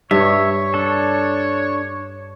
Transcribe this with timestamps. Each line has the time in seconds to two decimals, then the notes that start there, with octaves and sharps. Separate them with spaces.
0.11 G2 C#5 E5
0.74 D4 A4